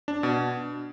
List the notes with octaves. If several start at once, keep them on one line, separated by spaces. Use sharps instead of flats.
D4
B2